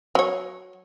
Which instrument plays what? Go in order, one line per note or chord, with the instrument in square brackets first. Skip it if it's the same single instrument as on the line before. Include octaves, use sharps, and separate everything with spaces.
[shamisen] F#3 C#5